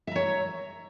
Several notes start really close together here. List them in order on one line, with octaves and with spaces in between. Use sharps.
E5 A#5 C#5